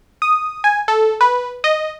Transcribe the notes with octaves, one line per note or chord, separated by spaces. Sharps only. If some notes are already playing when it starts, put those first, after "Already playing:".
D#6
G#5
A4
B4
D#5